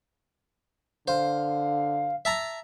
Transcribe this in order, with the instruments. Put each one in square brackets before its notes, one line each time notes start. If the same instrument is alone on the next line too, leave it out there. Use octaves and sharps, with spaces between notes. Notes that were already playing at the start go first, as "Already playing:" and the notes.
[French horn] D3 [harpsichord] C5 [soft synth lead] F5
[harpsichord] E5 A5 A#5